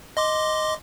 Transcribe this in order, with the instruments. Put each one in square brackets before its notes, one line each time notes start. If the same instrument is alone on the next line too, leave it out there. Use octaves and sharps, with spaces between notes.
[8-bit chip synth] D#5 C6 D6